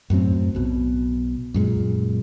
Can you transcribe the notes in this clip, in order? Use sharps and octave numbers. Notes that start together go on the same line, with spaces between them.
F#2 A2 F#3 C4
B1 B2
F#2 A#2 G#3